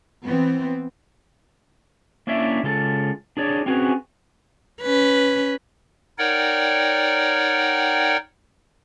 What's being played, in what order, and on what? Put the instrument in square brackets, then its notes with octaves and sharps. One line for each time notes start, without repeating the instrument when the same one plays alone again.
[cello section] E3 B3 C4
[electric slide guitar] A#3 C#4 D4 E4 E5
C#3 G#3 F4 A4
D4 G#4 C#5 D5
C4 C#4 F#4 G#4 B4
[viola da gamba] C#4 B4
[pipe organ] D#4 A#4 C#5 D5 F#5 G5